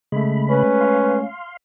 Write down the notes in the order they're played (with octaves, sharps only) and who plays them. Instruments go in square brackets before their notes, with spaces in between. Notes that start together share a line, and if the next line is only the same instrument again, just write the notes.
[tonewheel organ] C#3 B5 [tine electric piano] G#3 A3
[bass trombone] C#4 [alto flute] B4
[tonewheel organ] F5 C6